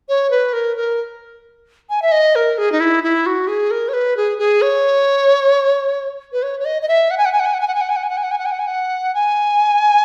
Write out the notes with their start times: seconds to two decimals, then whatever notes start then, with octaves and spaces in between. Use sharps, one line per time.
0.09 C#5
0.31 B4
0.53 A#4
0.76 A#4
1.89 G#5
2.02 E5
2.12 D#5
2.35 A#4
2.58 G#4
2.72 D#4
2.80 E4
3.03 E4
3.26 F#4
3.48 G#4
3.71 A#4
3.89 C#5
3.93 B4
4.17 G#4
4.38 G#4
4.62 C#5
6.32 B4
6.43 C#5
6.60 C#5
6.65 D#5
6.82 D#5
6.88 E5
7.11 F#5
7.18 G#5
7.25 F#5
7.32 G#5
7.40 F#5
7.46 G#5
7.54 F#5
7.61 G#5
7.68 F#5
7.75 G#5
7.81 F#5
7.89 G#5
7.96 F#5
8.03 G#5
8.09 F#5
8.17 G#5
8.23 F#5
8.31 G#5
8.38 F#5
8.46 G#5
8.52 F#5
8.59 G#5
8.67 F#5
9.14 G#5